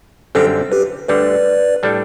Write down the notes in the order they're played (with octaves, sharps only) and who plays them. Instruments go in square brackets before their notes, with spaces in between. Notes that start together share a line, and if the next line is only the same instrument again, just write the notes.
[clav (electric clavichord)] F#2 D3 G3 C4 G4 [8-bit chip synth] A4 C5
[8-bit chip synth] G4 B4
[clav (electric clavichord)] D2 D3 G3 [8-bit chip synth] B4 D5
[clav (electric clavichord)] A2 G3 D4 A4